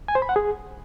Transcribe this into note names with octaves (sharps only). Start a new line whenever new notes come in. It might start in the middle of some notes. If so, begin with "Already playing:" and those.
G#5
C5
B5
F#5
G#4